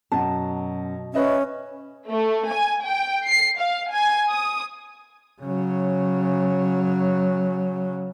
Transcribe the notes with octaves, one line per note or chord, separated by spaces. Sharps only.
F#2 B2 A5
C#4 B4 D#5 E5
A3
G#5
G5
C7
F5
G#5
D#6
C#3 F#3